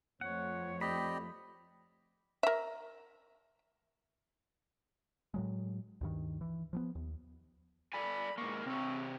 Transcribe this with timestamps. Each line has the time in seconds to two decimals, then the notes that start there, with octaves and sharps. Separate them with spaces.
0.21 F2 A3 C#5 F#5
0.81 C4 G4 D5 D#5 B5
2.43 A#4 E5
5.34 A2 F#3 G#3
6.01 D2 G2 D#3
6.41 E3
6.73 F3 G3 B3
6.95 D#2
7.93 A4 D5 G#5 B5
8.38 G#2 A#3 C#6
8.66 C3 C4 C#5